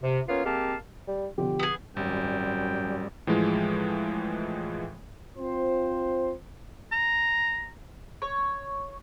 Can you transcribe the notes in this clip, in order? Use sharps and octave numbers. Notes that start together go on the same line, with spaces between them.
C3
A#3 B3 C#4 F4 C#5 F5
G#3 A#3 C4 G4 F5 A5
G3
B2 D3 F3 G4
B3 G#4
G#1 F#2 G3 G5
A2 E3 F3 G#3
C4 F4 C5
A#5
C#5